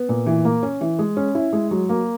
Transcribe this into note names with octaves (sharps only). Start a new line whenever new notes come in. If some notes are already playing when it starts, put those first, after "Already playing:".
Already playing: B3
A#2
E3
A#3
C#4
E3
G#3
C#4
E4
G#3
F#3
A#3